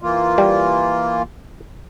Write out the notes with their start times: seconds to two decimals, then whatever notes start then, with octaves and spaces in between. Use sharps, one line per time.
0.02 E3 A#3 F4
0.38 G3